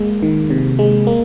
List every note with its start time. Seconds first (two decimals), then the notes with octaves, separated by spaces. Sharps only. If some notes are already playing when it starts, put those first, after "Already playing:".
Already playing: G#3 A#3
0.23 D#3
0.50 C3
0.79 G#3
1.07 A#3